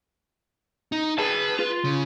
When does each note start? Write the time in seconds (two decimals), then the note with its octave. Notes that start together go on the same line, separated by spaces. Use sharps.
0.92 D#4
1.18 G#4 B4 A5
1.59 F4
1.85 C#3